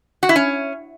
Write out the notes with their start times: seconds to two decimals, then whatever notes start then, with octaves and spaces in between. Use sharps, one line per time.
0.23 F#4
0.29 E4
0.36 C#4